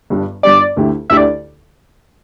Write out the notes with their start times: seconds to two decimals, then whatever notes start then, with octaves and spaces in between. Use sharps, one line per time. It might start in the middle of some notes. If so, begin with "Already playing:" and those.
0.10 G1 G2 G3 D4
0.43 G1 G2 G3 D4 D5
0.76 D2 D3 A3 E4 G4
1.10 D2 D3 A3 E4 G4 E5
1.17 D5